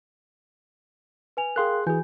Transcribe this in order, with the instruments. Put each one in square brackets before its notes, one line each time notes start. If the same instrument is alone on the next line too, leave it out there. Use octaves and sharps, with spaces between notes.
[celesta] B4 G#5 F7
[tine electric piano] G#4 C6 F#6 [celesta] A#4 F5 G5
[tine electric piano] E3 G#4 [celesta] F#4 G#5 G6